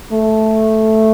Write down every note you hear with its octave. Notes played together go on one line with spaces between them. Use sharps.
A3